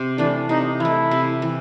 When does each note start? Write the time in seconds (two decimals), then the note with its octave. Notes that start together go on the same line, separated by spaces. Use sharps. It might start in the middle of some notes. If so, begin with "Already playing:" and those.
Already playing: C3
0.18 E3 A3 D4
0.49 C3 D#4
0.80 E3 A3 E4
1.11 C3
1.42 E3